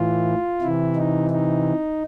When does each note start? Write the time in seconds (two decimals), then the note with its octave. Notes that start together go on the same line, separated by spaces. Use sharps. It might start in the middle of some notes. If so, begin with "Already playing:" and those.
Already playing: A2 E3 F4
0.61 C3 E3 E4
0.96 D#4
1.30 D#4